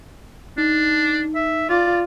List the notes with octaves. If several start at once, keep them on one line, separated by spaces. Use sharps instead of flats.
D4 D#4
E5
F4 D5